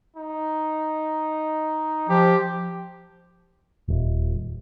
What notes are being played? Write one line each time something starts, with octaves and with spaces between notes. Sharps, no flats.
D#4
F3 G4
D#1